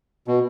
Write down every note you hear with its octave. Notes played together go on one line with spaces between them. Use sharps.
B2